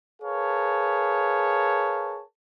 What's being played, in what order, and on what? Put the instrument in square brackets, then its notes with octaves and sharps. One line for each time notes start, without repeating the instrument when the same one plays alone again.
[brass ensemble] G#4 A#4 B4 C#5 F5 A5